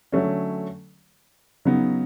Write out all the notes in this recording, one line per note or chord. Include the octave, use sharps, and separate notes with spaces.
D3 F#3 A3 C#4
C#3 F#3 B3 D#4